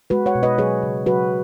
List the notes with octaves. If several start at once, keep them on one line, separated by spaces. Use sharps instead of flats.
G#3 F#4 B4
C#5 F#5
B2
B4 D#5
F#3 G#4 C#5
C#3
F#3 F#4 B4